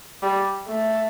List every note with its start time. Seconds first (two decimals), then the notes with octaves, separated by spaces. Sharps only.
0.23 G3
0.68 A3